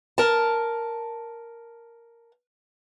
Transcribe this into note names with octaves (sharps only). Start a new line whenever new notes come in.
A#4 A5